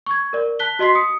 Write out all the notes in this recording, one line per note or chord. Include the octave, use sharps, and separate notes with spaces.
C#6 G#6
A#4 D5
A5 F#6 B6 G7
F#4 D#5 C6 B6 C7
D#6 C#7